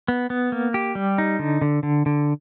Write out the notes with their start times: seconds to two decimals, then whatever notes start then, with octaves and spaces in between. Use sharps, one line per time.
0.08 B3
0.30 B3
0.52 A#3
0.74 G4
0.95 G3
1.18 D#4
1.39 D3
1.62 D3
1.83 D3
2.06 D3